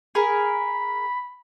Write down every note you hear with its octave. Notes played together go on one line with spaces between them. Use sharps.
G#4 A#4 B5